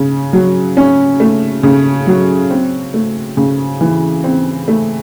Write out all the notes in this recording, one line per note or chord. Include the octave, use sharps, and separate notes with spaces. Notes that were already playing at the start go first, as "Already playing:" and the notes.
Already playing: C#3
F#3
C#4
A3
C#3
F#3
C4
A3
C#3
E3
C4
A3